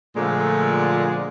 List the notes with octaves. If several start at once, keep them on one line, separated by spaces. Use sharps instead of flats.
A#2 D3 F3 G#3 A3